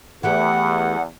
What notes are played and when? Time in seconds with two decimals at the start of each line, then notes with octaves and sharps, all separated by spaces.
0.23 E2 E3 A3 G4 F#5